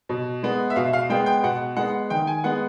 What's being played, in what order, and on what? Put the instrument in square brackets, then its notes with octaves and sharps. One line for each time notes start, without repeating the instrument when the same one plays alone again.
[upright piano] B2
G#3 B3
E5
B2 F5
F5
G#3 B3 G5
G5
B2 F#5
G#3 B3 F#5
D#3 G5
G#5
G#3 B3 F#5